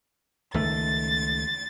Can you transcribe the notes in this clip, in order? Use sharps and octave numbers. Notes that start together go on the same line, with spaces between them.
C#2 D#3 A3 A6